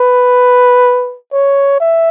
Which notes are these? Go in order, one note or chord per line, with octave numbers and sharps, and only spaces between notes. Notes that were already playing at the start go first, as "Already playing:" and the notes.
Already playing: B4
C#5
E5